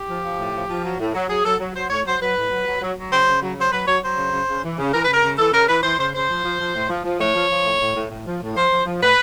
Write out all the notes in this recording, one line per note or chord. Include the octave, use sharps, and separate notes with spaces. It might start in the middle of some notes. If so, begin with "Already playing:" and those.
Already playing: G4
F3
F3
A2
F3
F3
F#3
A2
F#3
F#3 G#4
F#3 A4
F#3
F#3 C5
A2 C#5
F#3 C5
F#3 B4
A2
F#3
F#3
F#3
F#3
C#3 C5
C#3
F#3
F#3 C5
F#3 B4
F#3 C#5
F#3 C5
C#3
C#3
C#3
E3
C#3
E3 A#4
C#3 B4
A#4
C#3
E3 A4
C#3 A#4
E3 B4
E3 C5
C#3 C5
C#3 C5
F3
F3
F3
A2
F3
F3
A2 C#5
F3
F3
A2
A2
A2
A2
F3
A2
F3 C5
F3
F3
A2 B4